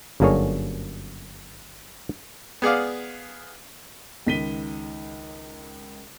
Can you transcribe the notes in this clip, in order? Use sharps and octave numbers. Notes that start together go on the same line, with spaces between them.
G1 F#2 A#3 D4 G#4 C#5
B3 G#4 D5 F5
C#2 D#3 B6 D#7 G7